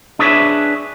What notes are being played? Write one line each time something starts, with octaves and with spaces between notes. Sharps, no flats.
D4 G#4 A4 B4 C#5 E5